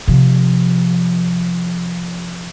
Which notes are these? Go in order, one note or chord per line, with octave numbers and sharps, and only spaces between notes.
C3 F3